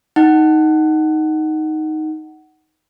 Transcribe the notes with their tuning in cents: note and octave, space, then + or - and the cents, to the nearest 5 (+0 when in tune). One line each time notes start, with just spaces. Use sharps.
D#4 +5 F#5 +15